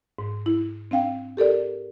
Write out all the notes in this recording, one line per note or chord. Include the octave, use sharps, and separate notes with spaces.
G#2
E4
C4 D4 F5 G5
G4 A4 A#4 D5